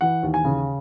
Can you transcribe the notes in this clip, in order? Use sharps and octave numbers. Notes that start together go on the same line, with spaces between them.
E3 F#5
D#2
G#5
C#3